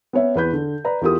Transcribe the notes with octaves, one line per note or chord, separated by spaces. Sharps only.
B3 C#4 C#5 E5
E2 B4 G6
D3
B4 D5 A#5
E2 F4 G4 A#4 D#6